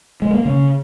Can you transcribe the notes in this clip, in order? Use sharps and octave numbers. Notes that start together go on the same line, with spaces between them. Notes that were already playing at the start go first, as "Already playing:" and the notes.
G#3
A#3
C#3